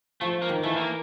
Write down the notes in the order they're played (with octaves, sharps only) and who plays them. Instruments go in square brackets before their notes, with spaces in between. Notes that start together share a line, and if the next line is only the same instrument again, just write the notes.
[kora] F3 [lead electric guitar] A3
[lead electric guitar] A#3
[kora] D#3
[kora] E3 [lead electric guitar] A3
[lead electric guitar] A#3